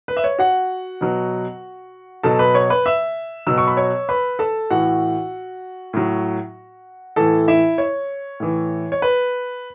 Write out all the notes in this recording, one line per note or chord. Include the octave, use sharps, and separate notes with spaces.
B4
E5
C#5
F#4 F#5
B2 F#3
B2 F#3 A4 A5
B4 B5
C#5 C#6
B4 B5
E5 E6
B2 F#3 E6
C#6
B5
C#5 C#6
B4 B5
A4 A5
A2 E3 F#4 F#5
A2 F#3
A2 E3 A4 A5
E4 E5
C#5
A2 E3
C#5
B4